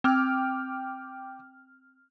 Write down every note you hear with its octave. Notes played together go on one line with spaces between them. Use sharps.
C4 G5 D6 F6